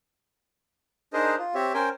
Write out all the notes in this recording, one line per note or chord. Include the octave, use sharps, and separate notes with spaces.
D4 D#4 G#4 A#4 C5 D#5
F4
C4 G4 C#5 E5
C#4 A#4 C5 G5 G#5